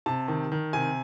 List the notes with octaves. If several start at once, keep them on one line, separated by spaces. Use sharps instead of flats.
C3 A5
D#3
D#3
C3 G#5